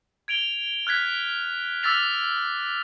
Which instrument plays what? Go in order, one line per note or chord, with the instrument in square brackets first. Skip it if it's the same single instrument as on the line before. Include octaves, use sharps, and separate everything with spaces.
[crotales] G#6 D7 F7 G7
F6 F#6 G#6 B6
D6 E6 F6 A6 B6 F7